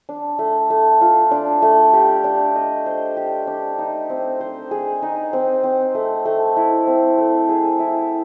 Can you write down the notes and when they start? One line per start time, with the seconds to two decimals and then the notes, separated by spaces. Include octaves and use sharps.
0.09 D4
0.39 A3
0.70 A3
1.01 F4
1.31 D4
1.62 A3
1.93 G4
2.24 D4
2.55 D#5
2.86 C5
3.17 G4
3.47 D4
3.79 D#4
4.10 C4
4.40 C5
4.71 G#4
5.02 D#4
5.33 C4
5.63 C4
5.95 A3
6.25 A3
6.57 E4
6.87 C4
7.18 A3
7.49 G#4
7.79 E4